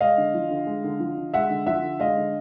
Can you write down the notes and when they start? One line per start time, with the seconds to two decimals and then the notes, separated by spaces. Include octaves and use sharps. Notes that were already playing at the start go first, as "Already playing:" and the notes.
0.01 G#3 D#5 F5
0.18 D3
0.34 F3
0.51 D3
0.67 G#3
0.84 D3
1.00 F3
1.18 D3
1.34 G#3 E5 F#5
1.50 D3
1.66 F3 E5 F#5
1.83 D3
2.00 G#3 D#5 F5
2.17 D3